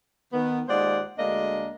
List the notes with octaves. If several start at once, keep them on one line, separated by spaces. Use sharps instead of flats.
D#3 B3
D#2 G#3 F4 C5 D5 F#5
D2 G#3 A#3 D4 D#5